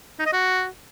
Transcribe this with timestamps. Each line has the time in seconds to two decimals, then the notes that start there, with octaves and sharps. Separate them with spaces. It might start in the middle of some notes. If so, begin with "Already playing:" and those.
0.19 D#4
0.26 D#5
0.33 F#4